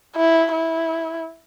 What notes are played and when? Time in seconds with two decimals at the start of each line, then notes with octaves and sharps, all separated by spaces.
0.15 E4
0.52 E4